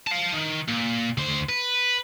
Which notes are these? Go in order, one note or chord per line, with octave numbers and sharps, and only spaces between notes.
F5 A5
D#3
A#2
D2 C5
B4